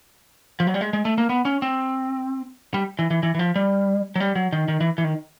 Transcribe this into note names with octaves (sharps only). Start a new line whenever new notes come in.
F3
F#3
G3
G#3
G#3
A3
A#3
B3
C#4
C4
G3
E3
E3
E3
E3
F3
G3
F#3
G3
F#3
D#3
D#3
E3
E3
D#3